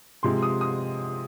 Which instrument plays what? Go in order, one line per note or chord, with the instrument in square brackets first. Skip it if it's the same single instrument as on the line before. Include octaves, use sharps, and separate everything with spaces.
[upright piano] C3 F3 G#3 C6
D#6
D#6